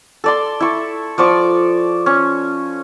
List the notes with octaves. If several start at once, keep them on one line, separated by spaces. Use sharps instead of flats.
A4 D5 C6
E4 C#6
F3 D5 C#6 D6
C#4